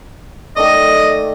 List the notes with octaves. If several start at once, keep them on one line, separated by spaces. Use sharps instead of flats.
D#3 A3 D5 D#5